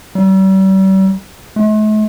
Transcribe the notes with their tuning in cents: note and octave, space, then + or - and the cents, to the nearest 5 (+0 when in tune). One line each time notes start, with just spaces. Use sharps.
G3 -40
A3 -45